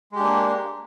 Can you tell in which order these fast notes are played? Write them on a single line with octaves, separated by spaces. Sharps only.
G#3 G4 D4 A#3